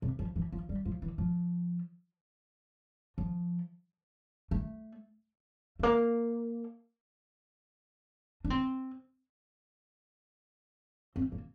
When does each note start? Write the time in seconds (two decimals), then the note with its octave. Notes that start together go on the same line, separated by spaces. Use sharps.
0.02 C3
0.19 F3
0.36 E3
0.52 F3
0.69 G3
0.85 F3
1.02 E3
1.18 F3
3.18 F3
4.51 A3
5.79 A3
5.83 A#3
8.45 D4
8.50 C4
11.16 C4
11.32 A#3